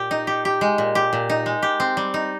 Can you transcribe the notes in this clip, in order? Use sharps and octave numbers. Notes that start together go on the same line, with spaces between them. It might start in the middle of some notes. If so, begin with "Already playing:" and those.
Already playing: A#2 G4
D#4
G4
G4
G#3
A#2
G4
A#2
D#4
G#3
G4
C4
G3
D#4